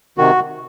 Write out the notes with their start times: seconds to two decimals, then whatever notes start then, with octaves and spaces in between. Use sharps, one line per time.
0.18 C3 D#3 F#4